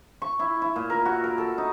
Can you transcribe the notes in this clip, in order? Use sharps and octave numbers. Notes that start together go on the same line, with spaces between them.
C#6
E4
E4
A#2
A#4
F#4
A#4
A4
D#4